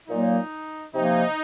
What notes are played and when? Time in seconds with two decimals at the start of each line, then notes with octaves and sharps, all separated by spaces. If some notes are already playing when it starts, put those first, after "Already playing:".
0.08 A#2 F#3 A#3 D#4
0.94 C3 F3 A#3 D#4